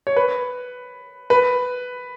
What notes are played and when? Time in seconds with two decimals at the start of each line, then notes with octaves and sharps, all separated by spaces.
0.07 C#5
0.16 B4
1.30 B4